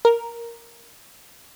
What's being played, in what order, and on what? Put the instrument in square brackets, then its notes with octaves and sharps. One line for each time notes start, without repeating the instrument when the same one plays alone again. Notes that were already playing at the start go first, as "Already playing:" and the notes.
[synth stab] A#4